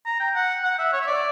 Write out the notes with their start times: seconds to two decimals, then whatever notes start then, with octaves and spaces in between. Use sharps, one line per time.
0.06 A#5
0.20 G5
0.35 F#5
0.64 F#5
0.78 E5
0.92 C#5
1.01 E5
1.07 D5